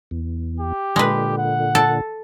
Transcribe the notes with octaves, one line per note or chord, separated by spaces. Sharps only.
E2
G4
A#2 D3 G#3 B4
F#5
A4